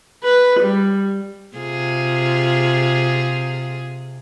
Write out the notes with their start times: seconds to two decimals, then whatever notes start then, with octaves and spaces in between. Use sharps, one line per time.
0.24 B4
0.60 G3
1.57 C3 F4 G#4